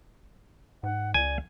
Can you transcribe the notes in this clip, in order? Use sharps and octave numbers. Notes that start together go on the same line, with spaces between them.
G#2 F#5
C#2 D5 G#5